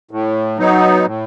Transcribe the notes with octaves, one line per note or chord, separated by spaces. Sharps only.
A2
F#3 B3 D#4
A2